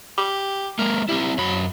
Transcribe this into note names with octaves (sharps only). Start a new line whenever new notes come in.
G4
G#3 A#3 A#4
G3 C4 E4
F#2 F#3 B5